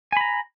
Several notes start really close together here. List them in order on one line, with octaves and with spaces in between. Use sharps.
G#5 B5 A#5